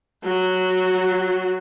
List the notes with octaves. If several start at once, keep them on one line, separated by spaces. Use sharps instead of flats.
F#3 F#4